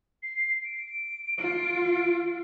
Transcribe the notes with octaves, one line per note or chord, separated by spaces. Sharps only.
C7
D7
F4